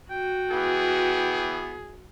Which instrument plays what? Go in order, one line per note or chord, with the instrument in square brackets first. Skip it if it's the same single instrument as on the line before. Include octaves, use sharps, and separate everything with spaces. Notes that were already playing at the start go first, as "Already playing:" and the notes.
[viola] F#4 [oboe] G5
[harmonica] E3 B3 [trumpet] G#4